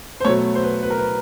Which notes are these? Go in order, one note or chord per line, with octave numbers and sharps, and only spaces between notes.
C5
B2 F#3 A3 C#5
C5
B4
B4
A#4
B4